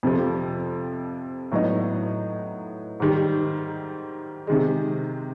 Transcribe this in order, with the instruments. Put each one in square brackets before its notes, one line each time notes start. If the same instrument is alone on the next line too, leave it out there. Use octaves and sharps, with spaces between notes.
[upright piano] F2 C3 F3
A2 F#3 B3 D#4
G#2 D#3 G3
C3 D#3 G#3